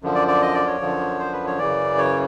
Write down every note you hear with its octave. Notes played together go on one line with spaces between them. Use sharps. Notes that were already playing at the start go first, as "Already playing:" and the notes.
F#2 D3 F3
D5
D5
D#5
D5
C#5
F#2 D3 F3
C5
B4
C#5
F#2 C#3 E3 D5
C#5